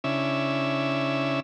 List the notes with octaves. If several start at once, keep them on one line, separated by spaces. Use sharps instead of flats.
C#3 C#4 D4 E4 E5